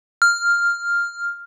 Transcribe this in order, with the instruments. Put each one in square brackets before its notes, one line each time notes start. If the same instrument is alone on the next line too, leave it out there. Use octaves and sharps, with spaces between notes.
[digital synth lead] F6